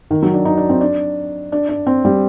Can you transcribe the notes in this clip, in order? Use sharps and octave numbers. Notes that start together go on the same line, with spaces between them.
D#3
F#3
D4
D#4
D4
C4
D4
D4
D4
C4
G3